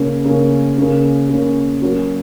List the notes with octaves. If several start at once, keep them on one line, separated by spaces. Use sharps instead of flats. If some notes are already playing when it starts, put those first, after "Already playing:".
Already playing: C#3 A#3 C#4
C#3 A#3 C#4
C#3 A#3 C#4
C#3 A#3 C#4
F#3 A#3 C#4 F#4